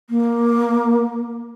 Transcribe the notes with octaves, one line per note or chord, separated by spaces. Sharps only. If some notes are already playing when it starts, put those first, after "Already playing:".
A#3